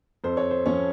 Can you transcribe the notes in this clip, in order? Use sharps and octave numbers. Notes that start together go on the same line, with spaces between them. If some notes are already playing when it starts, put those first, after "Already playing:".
F2 C5
C#5
C5
F3 C#4 C#5